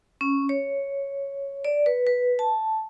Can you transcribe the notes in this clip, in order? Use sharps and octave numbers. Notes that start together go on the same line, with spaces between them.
C#4
C#5
D5
B4
B4
A5